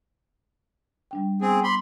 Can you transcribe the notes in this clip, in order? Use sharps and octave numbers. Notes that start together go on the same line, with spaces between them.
G3 D4 G5
B3 C4 G#4
B5 C6 D6